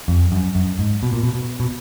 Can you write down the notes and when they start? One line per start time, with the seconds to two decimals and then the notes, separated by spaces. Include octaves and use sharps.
0.08 F2
0.32 F#2
0.55 F#2
0.79 G#2
1.03 B2
1.13 A#2
1.23 B2
1.34 B2
1.60 B2